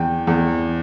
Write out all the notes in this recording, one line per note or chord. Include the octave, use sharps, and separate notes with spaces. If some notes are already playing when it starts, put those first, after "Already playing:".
Already playing: E2 G5
E2